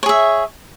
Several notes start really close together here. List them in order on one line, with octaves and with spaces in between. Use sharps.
C#5 G#4 E5